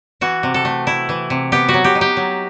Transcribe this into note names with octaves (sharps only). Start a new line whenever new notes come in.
E3 F#4
C3
A4
A3
E4
E3
C3
B3 G4
F#4
F#3
G4
D#4
G4
F#3